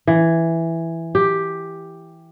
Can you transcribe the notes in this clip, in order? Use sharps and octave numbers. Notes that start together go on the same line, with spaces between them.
E3
G4